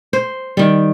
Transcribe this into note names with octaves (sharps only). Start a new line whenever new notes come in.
C5
D#3 G3